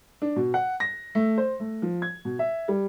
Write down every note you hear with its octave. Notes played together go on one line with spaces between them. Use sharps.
D4
B2
F#5
A#6
A3
C5
A3
F3
G#6
B2
E5
G3